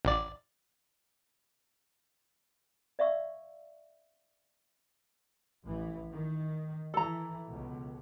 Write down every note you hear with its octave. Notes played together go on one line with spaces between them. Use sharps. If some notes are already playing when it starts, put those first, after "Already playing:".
A1 D5
D5 E5 F5 C#6 E6
A1 E3
D#3
E3 A4 A#5
C#2 B2